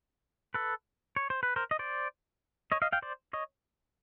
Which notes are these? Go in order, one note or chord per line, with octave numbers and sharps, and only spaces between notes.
A4 B4
C#5
C5
B4
A#4 C5
D#5
C5 D5
C#5 D#5
D#5 F5
F5 G5
C5 D5
C#5 D#5